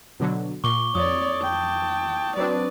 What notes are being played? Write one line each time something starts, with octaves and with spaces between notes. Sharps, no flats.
B2 D3 F#3
A#2 C#6 D6 G7
F2 C#5 D5 D#6
G5 A5
F#3 C4 D4 B4 D5